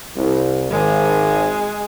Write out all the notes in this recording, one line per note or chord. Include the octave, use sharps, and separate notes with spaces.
C2
G#1 G#3